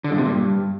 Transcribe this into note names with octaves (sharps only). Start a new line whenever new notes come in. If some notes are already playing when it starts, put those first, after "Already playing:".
D3
G2
C3
A#2
G2